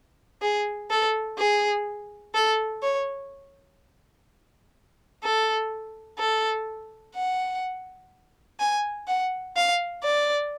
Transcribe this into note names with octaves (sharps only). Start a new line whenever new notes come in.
G#4
A4
G#4
A4
C#5
A4
A4
F#5
G#5
F#5
F5
D5